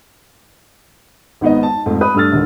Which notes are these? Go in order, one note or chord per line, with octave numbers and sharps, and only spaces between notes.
G#1 G#2 B3 D#4 D#5
A5
F2 G#2 A3
B4 D#6
G2 A3 D4 E6 F6 A6
D#1 G#2 D3 D#3